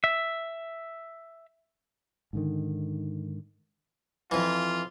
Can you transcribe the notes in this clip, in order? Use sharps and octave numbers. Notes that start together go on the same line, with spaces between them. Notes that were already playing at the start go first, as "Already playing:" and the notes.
E5
G#2 D3 D#3
F2 E3 F4